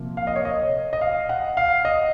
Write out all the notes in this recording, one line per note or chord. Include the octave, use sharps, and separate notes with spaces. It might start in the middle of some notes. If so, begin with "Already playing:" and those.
Already playing: C3 F3 A#3
F5
D#5
C#5
D#5
D#5
F5
F#5
F5
D#5